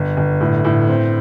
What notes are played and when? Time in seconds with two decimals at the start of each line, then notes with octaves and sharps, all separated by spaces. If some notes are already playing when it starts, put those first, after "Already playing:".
Already playing: G1
0.17 G1
0.41 A2
0.64 A2
0.88 C4